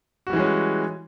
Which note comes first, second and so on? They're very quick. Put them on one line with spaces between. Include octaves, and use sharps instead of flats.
F#4 G3 E3 G#3 C#4